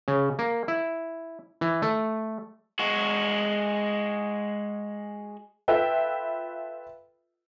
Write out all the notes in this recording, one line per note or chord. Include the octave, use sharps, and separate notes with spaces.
C#3
A#3
E4
E3
A3
G#3 F#4
F4 A4 B4 E5 G5